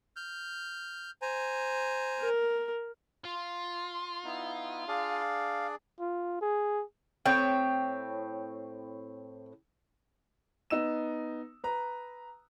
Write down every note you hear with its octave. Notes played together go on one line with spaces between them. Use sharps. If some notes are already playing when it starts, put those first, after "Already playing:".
F6 G6
C5 G#5 A#5
A#4
F4 C6
B3 D#4 E4
D4 G#4 D5 F5
F4
G#4
A2 C4 C#5 G5
B3 D#4 E6 E7
B4 A#5